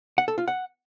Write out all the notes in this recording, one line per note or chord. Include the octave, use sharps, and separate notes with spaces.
F#5
A4
F4
F#5